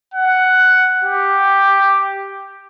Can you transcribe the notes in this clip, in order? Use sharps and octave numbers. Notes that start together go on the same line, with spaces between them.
F#5
G4